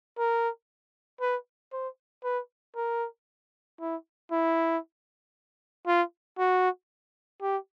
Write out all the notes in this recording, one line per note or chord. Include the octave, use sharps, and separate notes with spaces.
A#4
B4
C5
B4
A#4
E4
E4
F4
F#4
G4